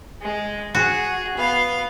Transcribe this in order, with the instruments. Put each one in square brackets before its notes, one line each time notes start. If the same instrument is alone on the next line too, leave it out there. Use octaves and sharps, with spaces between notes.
[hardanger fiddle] G#3
[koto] F#4 [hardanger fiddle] G#4
[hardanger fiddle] B3 F5